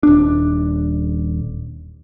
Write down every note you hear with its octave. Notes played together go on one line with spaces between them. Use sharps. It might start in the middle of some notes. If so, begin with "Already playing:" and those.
D#1 D4